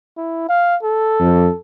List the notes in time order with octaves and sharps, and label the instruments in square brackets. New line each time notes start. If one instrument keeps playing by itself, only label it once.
[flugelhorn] E4
F5
A4
[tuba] F2